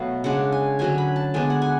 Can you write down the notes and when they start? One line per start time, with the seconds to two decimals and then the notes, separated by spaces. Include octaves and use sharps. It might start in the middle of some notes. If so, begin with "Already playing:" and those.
Already playing: B2 F#3 A3 F5
0.24 C#3 G#3 D4 F#5
0.52 G#5
0.79 D3 F#3 C#4 G#5
0.98 B5
1.16 A5
1.34 D3 G#3 B3 D4 G#5
1.50 F#5
1.62 G#5